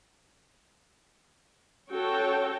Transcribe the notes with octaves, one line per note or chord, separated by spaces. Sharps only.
C#4 F#4 A4 C#5 G5